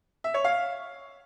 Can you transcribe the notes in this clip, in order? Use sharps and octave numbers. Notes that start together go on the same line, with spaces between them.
E5
C#5
F5